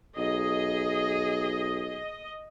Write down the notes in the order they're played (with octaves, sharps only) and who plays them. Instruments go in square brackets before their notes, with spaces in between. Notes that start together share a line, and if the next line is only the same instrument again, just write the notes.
[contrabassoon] B1 [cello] G#4 [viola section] D#5